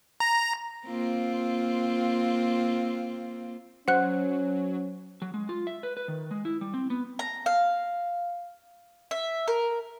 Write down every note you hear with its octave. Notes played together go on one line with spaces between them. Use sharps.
A#5
A#3 C4 F4
F#3 C#4 C5 F#5 F#6
F#3
G#3
F4
E5
B4
B4
D#3
G#3
E4
G3
C4
B3
A#5
F5
E5
A#4